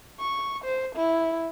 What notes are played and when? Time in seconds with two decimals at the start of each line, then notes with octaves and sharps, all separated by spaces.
0.20 C#6
0.65 C5
0.96 E4